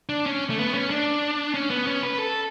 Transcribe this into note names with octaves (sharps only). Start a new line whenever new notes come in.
D4
C#4
A3
B3
C#4
D4
C#4
B3
C#4
B4
A4